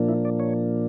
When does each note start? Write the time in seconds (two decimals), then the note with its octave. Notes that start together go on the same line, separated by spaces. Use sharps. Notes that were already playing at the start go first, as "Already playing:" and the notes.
Already playing: A#2 F3 A#3 D4
0.09 E4
0.25 D5
0.40 C#5